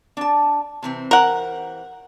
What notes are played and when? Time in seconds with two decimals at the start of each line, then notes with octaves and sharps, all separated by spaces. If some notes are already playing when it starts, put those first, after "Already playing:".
0.17 D4 A5
0.83 C3 E3 C4
1.11 A#4 F#5